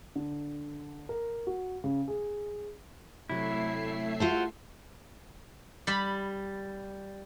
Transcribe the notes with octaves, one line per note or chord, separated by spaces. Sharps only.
D3
A#4
F#4
C#3
G#4
C3 F#3 A3 E4 E5 C7
F4 F#4 C5 A5
G3 G4 B5